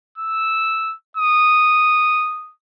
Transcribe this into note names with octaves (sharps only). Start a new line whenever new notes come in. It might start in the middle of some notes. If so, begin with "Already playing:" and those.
E6
D#6